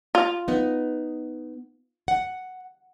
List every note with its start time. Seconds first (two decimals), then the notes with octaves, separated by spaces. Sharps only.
0.15 F4
0.48 B3 D#4
2.08 F#5